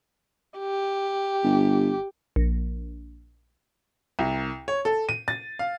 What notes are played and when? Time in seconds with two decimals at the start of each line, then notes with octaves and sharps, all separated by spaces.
0.59 G4
1.44 G1
2.36 A#1
4.19 C2
4.68 C#5
4.85 A4
5.09 D#7
5.28 A6
5.59 F5